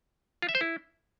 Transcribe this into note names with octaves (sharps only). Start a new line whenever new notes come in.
F4
E5
C5
E4